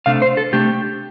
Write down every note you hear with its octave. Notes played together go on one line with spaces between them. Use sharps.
C3 A3 D4 F5
C5
A4
C3 A3 D4 G4